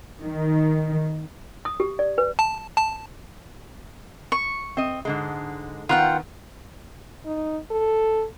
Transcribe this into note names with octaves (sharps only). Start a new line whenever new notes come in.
D#3
D#6
G4
D5
B4
A5
A5
C#6
C4 D#5
G#2 D3 G#3
D#3 B3 F4 F#5 G5
D#4
A4